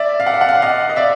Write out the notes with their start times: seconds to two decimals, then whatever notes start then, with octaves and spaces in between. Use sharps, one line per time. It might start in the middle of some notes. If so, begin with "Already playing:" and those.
Already playing: D5 E5
0.20 F5
0.27 F#5
0.34 F5
0.41 F#5
0.49 F5
0.55 F#5
0.62 D#5 F5
0.89 D#5
0.96 D5 E5